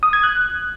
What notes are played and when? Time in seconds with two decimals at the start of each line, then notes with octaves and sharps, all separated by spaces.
0.03 D#6
0.13 G#6
0.23 F#6